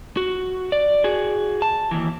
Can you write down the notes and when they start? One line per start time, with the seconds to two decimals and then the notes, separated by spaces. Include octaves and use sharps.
0.17 F#4
0.72 D5
1.04 F#4 G#4
1.62 A5
1.91 D#2 E3